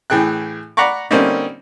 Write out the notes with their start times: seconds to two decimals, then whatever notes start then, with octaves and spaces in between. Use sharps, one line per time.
0.10 A2 E3 G#4 G5 F#6
0.77 D5 F#5 A#5 B5 C#6 D6
1.11 D3 G3 A#3 C4 C#4 D#4